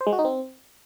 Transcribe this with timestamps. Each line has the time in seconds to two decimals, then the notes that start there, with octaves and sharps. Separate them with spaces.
0.01 C5
0.07 G#3
0.13 F#4
0.19 D#4
0.25 C4